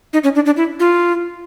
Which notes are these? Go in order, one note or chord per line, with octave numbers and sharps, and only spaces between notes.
D#4
C#4
D4
D4
E4
F4